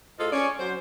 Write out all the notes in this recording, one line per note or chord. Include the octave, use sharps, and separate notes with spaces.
A2 F4 G#4 A4 C5 D#5
C#4 C#5 D5
F#3 C5